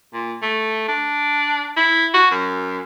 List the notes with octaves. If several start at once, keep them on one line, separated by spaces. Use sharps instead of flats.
A#2
A3
D4
E4
F#4
F#2